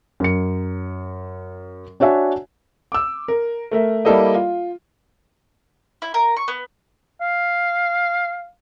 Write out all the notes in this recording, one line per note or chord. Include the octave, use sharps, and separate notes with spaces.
F#2 C#7
D4 F#4 C#5 E5 G#5
D6 E6
A#4
A3 A#4 E5
G3 A#3 E4 A4 D5 D#5
F4
E4
A#4
C#6
B3
F5